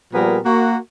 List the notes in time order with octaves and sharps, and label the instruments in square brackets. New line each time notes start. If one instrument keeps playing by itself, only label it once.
[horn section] A#2 F3 G3 B3 G#4 A#4
A#3 F#4